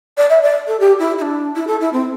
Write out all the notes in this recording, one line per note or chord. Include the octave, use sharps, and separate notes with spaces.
D5
E5
D5
A4
G4
E4
E4
D4
E4
A4
E4
C4